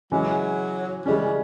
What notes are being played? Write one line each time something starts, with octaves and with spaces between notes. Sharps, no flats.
C#3 E3 F#3 G#3 C#4
C#3 E3 G3 G#3 C#4